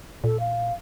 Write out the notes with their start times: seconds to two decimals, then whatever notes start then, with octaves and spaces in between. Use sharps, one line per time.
0.24 A#2 A4
0.40 F5